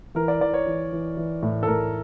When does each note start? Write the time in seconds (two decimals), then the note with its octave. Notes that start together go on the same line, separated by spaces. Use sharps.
0.15 E3 A#4
0.28 D5
0.41 E3 D5
0.54 C#5
0.67 E3
0.92 E3
1.17 E3
1.42 A2
1.63 A4
1.67 A2 A#4